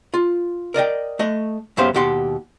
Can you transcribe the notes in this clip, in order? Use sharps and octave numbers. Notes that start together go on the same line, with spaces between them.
F4
A#4 D5 D#5 G5
A3 D#5
F#2 C#3 B3 G4 C5 F5
D#2 B2 G4 F#5 C6